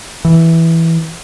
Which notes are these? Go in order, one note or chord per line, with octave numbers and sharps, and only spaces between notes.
E3